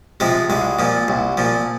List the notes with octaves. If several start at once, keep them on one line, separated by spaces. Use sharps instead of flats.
C3 F3 G#3
C2 G#3
A#2 F3
C2
A#2 F3